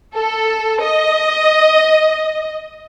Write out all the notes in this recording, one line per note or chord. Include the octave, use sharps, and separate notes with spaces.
A4
D#5